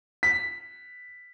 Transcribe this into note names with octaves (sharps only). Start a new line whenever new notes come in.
B6